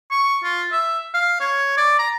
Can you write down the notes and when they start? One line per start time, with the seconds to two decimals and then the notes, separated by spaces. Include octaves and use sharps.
0.11 C#6
0.44 F4
0.72 E5
1.14 F5
1.40 C#5
1.77 D5
1.99 A#5